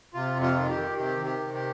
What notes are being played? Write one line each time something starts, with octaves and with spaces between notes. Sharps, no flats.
C3 F4
F2
F4
D#3
G4
D#3
C3 G4
D#3
G4
C3
G4